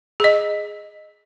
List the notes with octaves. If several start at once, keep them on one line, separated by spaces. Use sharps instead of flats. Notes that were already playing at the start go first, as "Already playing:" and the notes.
G#4 D#5